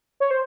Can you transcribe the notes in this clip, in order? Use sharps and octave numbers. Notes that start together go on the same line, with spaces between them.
C#5
C5